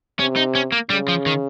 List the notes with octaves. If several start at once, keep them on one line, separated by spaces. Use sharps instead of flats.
C3 C#4
D#4
C#4
A#3
C#3 G3
F3
D#3